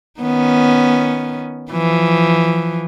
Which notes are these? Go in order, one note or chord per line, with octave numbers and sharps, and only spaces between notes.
D#3 B3 C#4
E3 F3